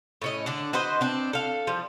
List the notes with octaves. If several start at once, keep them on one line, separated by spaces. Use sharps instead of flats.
A2 C#4 D#5
D3 D4
F#4 B4 C5 D#5
C4 D4
A4 F5
F3 G3